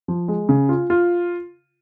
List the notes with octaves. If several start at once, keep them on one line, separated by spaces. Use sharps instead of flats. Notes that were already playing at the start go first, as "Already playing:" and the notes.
F3
G#3
C#3
F4
F4